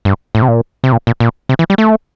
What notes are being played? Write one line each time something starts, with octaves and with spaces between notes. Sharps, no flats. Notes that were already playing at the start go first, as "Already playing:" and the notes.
G2
A2
C3
A#2
C3
A#2
A#2
A#2
C3
E3
G3
A3